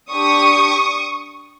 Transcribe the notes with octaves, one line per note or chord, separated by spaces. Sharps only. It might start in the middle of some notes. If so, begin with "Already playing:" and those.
D4 G4 C#6 D#6